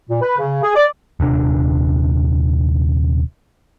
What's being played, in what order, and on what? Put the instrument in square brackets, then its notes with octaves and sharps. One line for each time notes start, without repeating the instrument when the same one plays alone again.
[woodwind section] A#2
B4
C#3
G#4
D5
[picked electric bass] D#1 C3 D4